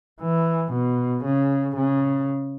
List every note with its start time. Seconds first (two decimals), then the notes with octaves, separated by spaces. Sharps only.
0.21 E3
0.72 B2
1.25 C#3
1.76 C#3